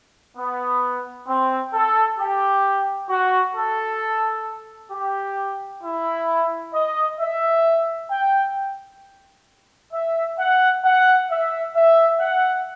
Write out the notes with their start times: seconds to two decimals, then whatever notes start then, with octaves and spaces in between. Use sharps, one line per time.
0.37 B3
1.27 C4
1.73 A4
2.18 G4
3.09 F#4
3.55 A4
4.92 G4
5.82 E4
6.73 D#5
7.19 E5
8.10 G5
9.93 E5
10.38 F#5
10.84 F#5
11.29 E5
11.75 E5
12.20 F#5